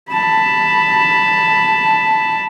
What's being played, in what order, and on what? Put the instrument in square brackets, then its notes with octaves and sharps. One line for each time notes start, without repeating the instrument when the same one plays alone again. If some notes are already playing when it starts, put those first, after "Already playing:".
[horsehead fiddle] A5 B5